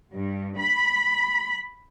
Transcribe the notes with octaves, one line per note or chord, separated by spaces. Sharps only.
G2
B5